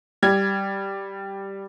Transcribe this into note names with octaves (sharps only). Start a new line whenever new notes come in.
G3 G#6